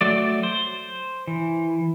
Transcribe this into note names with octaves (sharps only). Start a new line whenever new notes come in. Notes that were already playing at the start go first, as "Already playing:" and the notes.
F#3 A3 D5
C5
E3